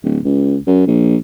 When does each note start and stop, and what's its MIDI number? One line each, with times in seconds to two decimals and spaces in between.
0.04 0.19 26
0.24 0.57 37
0.67 0.83 42
0.87 1.16 34